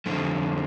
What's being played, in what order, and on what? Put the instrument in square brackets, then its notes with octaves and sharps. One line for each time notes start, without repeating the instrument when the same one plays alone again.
[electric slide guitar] F2 D3 A3 C4